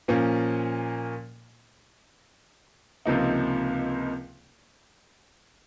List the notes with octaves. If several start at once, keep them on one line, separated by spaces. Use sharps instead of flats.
A#2 F3 A#3 C#4
C#2 C3 F3 A#3 D#4